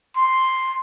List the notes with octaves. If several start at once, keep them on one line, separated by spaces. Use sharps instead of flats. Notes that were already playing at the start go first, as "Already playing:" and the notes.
C6